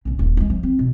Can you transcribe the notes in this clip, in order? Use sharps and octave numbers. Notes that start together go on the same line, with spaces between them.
A#1 C#3
D#1
F#3 G#3
F3
C4
B2